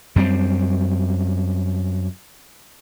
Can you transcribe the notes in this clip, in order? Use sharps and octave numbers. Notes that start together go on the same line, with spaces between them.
F#2 G3 B3 C4